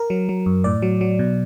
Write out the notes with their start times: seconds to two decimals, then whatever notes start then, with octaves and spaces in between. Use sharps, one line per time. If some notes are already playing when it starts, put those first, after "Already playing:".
Already playing: A#4
0.10 F#3
0.29 F#3
0.46 F#2
0.64 A2 D5
0.82 F#3
1.01 F#3
1.19 B2